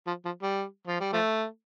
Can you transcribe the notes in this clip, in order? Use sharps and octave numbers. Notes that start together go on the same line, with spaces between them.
F3
F3
G3
F3
G3
F3 A3